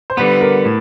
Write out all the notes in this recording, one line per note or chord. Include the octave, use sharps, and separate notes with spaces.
C5
D3 G3 B3 B4
A#4
A2